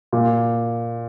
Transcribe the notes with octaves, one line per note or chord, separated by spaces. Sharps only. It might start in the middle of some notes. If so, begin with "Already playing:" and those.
A#2